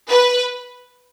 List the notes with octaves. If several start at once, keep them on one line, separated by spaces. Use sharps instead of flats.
B4